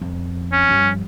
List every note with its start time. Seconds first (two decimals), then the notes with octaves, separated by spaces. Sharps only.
0.01 F2
0.52 C#4
0.69 G2 F3